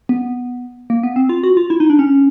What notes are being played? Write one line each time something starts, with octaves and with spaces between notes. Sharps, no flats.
B3
A#3
B3
C4
F4
F#4
F4
E4
D#4
D4
C#4